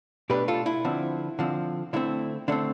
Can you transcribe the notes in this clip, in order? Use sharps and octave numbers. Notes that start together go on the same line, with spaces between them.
B2 A3 D4 G4 B4
F4 A4
E4
D3 F3 C4
D3 F3 C4
D3 A3 C4 E4
D3 A3 C4 D4